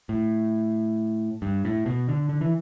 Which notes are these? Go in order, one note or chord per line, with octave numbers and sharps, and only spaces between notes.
A2
G2
A2
B2
D3
D3
E3